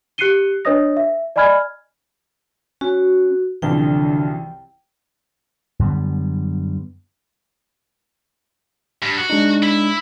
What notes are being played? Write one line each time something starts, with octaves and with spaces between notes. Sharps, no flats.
G4 F#6 C7 C#7 D#7 G7
D4 B4 C#5 D#5 D#6 A#6
E5
D5 D#5 G#5 B5 F6 G#6
C#4 F#4
C2 F#2 D3 E3 F3 G5
F#2 D3 G3 B3
G2
F#4
G#3 D4 D#4
E4